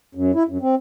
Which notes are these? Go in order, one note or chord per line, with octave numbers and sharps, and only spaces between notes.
F#2
E4
F#2
C4